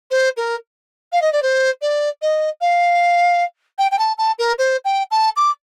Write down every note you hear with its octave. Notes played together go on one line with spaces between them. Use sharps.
C5
A#4
F5
D#5
D5
C5
D5
D#5
F5
G5
G5
A5
A5
A#4
C5
G5
A5
D6